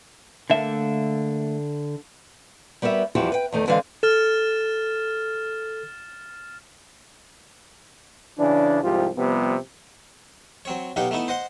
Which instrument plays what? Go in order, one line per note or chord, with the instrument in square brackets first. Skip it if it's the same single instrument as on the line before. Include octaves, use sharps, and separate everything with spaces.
[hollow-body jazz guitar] D3 E5 [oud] A3 A#3
[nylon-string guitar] G3 B3 F#4 A#4 E5
E2 F3 G3 E4 F#4 G4
B4 G5
E2 D#3 A3
D3 E3 G#3 C4 D5 F5
[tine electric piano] A4 [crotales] F6 A6 E7
[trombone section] C#3 E3 D4
C2 G#2 F3 F4 G4
C3 F3 G3 B3
[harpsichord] F#3 C4 C#5
B1 B2 D#4 G4 F5 F#5
A3 B3 D#4 E4
C5 D#5 F#5 C6